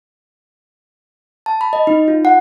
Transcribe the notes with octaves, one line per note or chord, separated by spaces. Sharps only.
A5
B5
D#5
D#4
F4
F#5